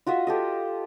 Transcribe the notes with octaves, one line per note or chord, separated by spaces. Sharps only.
F4 F#4 D#5 E5
G4 A4 D#5